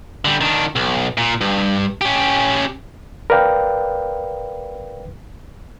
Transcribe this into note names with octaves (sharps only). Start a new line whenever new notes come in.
D3 G3
D#3 D4
B1
A#2
G2
C#4 G4
A#4 B4 D5 F5 G5